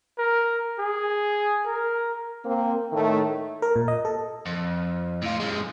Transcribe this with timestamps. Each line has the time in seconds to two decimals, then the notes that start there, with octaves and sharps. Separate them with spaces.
0.18 A#4
0.79 G#4
1.66 A#4
2.44 A#3 C4
2.93 A2 D#3 A3
3.62 A#4
3.76 A#2
3.88 D#5
4.05 A4
4.46 F2
5.22 A2 F4
5.40 F#2 G#3